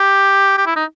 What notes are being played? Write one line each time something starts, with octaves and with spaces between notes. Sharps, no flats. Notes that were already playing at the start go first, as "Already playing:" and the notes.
Already playing: G4
G4
E4
D#4